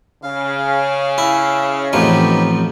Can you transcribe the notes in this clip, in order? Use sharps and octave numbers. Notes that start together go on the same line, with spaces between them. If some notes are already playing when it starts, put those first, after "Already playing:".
C#3 F5
E4
A1 F2 F3 B3 D#4 G4